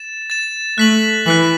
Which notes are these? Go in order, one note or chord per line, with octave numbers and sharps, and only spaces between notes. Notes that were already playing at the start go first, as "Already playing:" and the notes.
Already playing: A6 E7
A6 E7
A3 F#6 B6 F#7
E3 F#6 B6 F#7